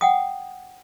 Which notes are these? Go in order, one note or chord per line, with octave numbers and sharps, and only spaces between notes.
F#5 G5 D#6